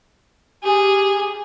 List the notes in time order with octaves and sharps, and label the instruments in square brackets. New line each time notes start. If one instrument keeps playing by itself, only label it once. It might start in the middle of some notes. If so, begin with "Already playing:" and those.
[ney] G4 [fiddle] G#4